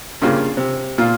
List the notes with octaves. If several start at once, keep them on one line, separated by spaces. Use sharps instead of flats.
G2 C#3 A#3 F4
C3
A#2 F4